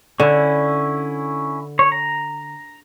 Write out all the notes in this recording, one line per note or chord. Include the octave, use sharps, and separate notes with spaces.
D3 C#4 E4
C#5
A#5